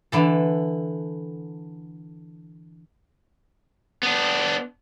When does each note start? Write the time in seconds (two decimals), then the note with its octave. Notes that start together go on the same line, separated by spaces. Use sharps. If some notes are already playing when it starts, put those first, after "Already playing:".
0.12 D3 E3 A4
4.03 B3 D4